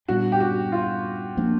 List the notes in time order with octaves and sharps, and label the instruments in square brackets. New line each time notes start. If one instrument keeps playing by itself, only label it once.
[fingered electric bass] A#2 G3 B3 D4 [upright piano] F#4
[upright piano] G4
F#4
F4
[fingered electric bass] F3 A#3 D4